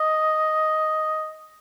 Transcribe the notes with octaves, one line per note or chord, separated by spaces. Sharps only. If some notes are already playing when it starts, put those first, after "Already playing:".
Already playing: D#5